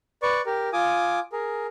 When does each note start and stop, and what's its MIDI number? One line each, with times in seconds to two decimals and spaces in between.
0.23 0.41 71
0.23 0.41 74
0.23 0.41 85
0.46 0.69 67
0.46 0.69 70
0.73 1.20 65
0.73 1.20 80
0.73 1.20 86
0.73 1.20 87
1.32 1.67 68
1.32 1.67 70